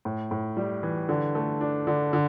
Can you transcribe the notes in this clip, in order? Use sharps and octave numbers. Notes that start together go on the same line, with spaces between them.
A2
A2
G3
E3
D3
A3
D4
D3
D3